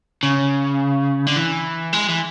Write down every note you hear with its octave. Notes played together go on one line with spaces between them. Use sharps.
C#3
D3
E3
G#3
E3